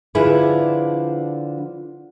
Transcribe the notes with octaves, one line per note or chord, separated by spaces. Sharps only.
D3 F3 D4 E4 G#4 B4